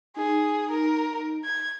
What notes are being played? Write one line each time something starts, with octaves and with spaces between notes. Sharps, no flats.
D#4 G#4
A#4
G#6